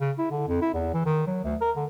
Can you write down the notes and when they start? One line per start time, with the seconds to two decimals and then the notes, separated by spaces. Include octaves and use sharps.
0.01 C#3
0.19 E4
0.31 D3
0.48 F2
0.62 E4
0.74 E2
0.94 E3
1.06 D#3
1.27 F#3
1.45 D2
1.61 A#4
1.76 D3